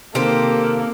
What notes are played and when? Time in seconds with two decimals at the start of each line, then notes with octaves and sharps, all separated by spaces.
0.15 C3 D#3 A#3 G4 A4 C5